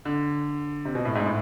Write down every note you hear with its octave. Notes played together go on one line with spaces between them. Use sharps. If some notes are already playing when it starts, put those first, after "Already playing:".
D3
C3
B2
A2
G#2
A2